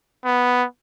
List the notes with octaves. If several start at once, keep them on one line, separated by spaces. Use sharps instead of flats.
B3